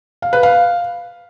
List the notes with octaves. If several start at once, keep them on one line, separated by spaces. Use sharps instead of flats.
F5
B4
F5